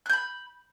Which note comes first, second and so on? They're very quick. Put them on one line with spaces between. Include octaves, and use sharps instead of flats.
F#6 G6 B5